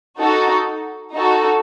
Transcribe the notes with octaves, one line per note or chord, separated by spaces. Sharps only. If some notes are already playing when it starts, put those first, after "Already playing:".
D#4 F#4 A4
D#4 F#4 A4